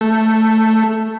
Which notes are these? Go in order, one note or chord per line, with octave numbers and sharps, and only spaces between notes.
A3